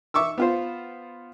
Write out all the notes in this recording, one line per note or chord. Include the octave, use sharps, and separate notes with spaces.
E5 C#6 D6 E6
B3 F4 C5